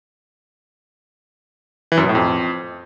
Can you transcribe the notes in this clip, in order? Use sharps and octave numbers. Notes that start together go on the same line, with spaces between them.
E3
F#2
B2
A2
F2